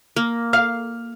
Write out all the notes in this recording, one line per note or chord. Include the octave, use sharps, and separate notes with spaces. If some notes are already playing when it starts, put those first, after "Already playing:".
A#3
F5 F6